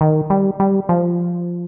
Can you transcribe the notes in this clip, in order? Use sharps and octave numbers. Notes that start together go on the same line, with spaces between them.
D#3
G3
G3
F3